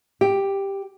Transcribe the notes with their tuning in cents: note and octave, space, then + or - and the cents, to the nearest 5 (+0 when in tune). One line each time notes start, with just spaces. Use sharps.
G4 +5